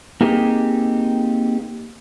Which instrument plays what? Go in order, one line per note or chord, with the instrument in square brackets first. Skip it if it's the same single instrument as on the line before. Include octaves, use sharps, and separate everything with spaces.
[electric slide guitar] A#3 C4 D#4 G4 G#4